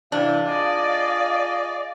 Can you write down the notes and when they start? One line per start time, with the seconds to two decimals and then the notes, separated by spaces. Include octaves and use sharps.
0.12 C3 E3 D4 F5
0.48 F4 G#4 D5 D#5